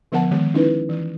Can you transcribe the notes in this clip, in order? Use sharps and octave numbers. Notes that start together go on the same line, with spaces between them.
D3 F3 B3 A#4 F#5 A5
D#3 G#3 B3
C#4 D#4 E4 B4
E3